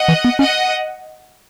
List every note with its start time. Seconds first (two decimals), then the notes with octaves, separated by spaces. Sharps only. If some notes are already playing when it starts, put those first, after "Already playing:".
Already playing: D#5 F#5
0.08 E3
0.24 B3
0.39 C#4 D#5 F#5